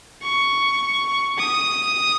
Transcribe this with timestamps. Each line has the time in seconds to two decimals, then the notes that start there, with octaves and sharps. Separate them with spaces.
0.22 C#6
1.38 D#6